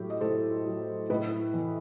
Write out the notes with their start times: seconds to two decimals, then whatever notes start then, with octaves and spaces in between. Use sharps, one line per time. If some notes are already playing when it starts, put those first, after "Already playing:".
Already playing: A2 F#3 G4
0.10 D#5
0.21 A2 A4 C5
0.66 F#3
1.10 A2 B4 D#5
1.54 E3